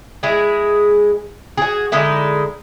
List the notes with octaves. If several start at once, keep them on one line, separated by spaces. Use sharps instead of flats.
G#3 E4 G#4
F#4 G#4
D3 G#3 D#4 E4